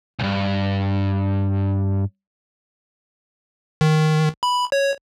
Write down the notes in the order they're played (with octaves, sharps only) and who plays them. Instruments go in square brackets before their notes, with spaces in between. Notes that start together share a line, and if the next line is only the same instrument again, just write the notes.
[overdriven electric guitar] C2 G2
[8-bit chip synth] D#3
B5
C#5